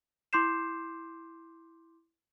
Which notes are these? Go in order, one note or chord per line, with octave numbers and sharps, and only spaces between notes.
E4 C6 D6 G6 C7 E7